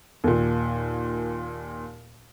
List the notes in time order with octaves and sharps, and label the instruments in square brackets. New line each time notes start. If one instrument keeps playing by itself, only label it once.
[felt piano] D#2 A#2